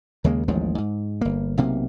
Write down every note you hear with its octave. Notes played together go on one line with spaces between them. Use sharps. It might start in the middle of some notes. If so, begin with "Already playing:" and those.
D#2 C#3 G#3 A#3
A1 D#2 F3 G#3
G#2
G1 A#3
B1 C3 A#3